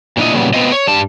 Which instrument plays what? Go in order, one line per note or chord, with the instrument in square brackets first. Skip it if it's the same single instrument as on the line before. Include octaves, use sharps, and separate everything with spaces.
[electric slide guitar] A#2 C4 D4 E4 D#5
A#2 C#3 F#3 G3 B3
B3 C4 F4 D#5
C#5
G2 G3 A5